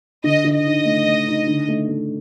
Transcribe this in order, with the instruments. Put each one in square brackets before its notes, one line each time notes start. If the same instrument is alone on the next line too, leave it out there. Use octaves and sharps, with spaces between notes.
[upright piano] D3 [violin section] D#5
[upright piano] D3
[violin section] D#5
[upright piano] D#4
A3
A3
D#4
D3
A3
A3